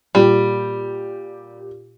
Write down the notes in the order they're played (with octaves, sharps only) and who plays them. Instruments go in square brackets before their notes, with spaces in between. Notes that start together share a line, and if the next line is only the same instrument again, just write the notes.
[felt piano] A#2 G4 [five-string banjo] G3